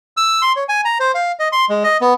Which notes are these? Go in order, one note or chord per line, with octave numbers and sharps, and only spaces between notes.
E6
C6
C#5
G#5
A#5
C5
F5
D#5
C6
G#3
D#5
B3